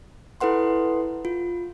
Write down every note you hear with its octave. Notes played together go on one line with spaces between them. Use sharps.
E4 A4 B4 F#5 C6
F4